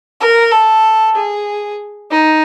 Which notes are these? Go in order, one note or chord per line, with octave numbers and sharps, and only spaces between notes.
A#4
A4
G#4
D#4